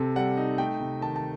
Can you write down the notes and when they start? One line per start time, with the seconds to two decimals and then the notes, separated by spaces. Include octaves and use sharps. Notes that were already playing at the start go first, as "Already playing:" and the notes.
Already playing: C3 C4 A4
0.16 G3 F#5
0.37 D#4
0.58 A3 G5
0.80 C3
1.01 D#3 A5
1.16 A5